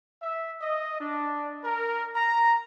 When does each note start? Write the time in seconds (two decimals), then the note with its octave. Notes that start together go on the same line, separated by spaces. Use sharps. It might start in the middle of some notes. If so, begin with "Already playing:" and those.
0.22 E5
0.62 D#5
1.01 D4
1.64 A#4
2.16 A#5